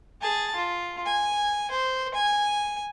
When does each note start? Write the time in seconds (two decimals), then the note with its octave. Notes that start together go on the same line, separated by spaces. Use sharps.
0.21 G#4 A5
0.55 F4
1.06 G#5
1.71 C5
2.15 G#5